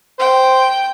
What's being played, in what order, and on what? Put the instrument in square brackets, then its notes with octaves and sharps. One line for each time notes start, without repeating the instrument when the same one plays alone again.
[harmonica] C5 [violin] G5